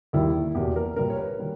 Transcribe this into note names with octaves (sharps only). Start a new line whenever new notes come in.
D#2 D#3 G3 A#3 E4
E2 B2 A#3 G4
A#4
A#2 G3 A#3 A#4
C#5
B4
D#3 G3 A#3